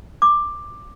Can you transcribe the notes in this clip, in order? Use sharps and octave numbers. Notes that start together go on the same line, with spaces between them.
D6